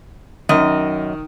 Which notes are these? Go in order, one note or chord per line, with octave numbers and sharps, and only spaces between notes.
F#2 D#3 D#5